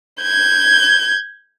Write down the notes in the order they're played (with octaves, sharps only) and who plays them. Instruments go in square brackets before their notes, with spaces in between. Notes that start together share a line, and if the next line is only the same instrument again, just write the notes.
[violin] G6 G#6